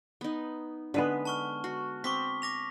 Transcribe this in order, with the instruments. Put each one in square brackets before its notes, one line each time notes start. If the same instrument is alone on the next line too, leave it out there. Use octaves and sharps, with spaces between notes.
[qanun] B3 D#4
[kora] D3 G#3 B3 [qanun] B4
[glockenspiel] A5 C#6 F6
[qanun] F#4
[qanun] C4 [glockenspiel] C#6 D6 B6
[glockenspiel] D6 A#6 F7